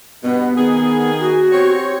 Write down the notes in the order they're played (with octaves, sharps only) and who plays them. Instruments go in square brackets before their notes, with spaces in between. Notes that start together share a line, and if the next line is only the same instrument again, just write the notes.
[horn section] G2 B2 [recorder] B3
[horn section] D#3 G#4 [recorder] B3
[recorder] F#4
[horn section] C4 G4 C#5